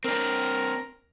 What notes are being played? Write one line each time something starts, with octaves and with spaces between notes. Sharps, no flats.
C4 D4 A#4